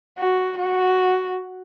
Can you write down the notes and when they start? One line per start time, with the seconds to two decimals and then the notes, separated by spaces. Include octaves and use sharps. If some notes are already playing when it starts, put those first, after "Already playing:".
0.18 F#4
0.58 F#4